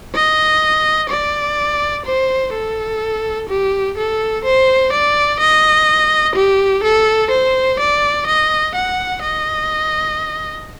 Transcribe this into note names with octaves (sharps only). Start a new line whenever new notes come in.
D#5
D5
C5
A4
G4
A4
C5
D5
D#5
G4
A4
C5
D5
D#5
F#5
D#5